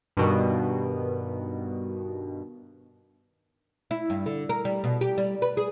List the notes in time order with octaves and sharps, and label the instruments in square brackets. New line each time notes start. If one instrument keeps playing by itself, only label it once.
[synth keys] G2 B2 D#3
[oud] E4
G2
D3
A#4
G3
B2
G4
G3
B4
G#4